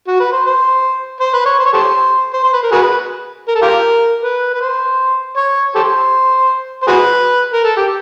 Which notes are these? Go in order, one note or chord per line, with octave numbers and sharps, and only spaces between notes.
F#4
B4
C5
C5
C5
B4
C#5
C5
C#5
G4 A4 C5
C5
C5
B4
A#4
F#4 G#4 B4
A#4
A4
F4 G4 A#4
B4
B4
C5
C#5
G4 A4 C5
C5
F#4 G#4 B4
A#4
A4
G4